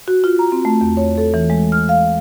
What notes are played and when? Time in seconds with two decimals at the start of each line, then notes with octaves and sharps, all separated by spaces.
0.08 F#4
0.24 F4
0.39 A#5
0.52 C4
0.65 A3
0.81 E2
0.97 C#5
1.18 A4
1.34 E3
1.50 G#3
1.72 F6
1.89 F5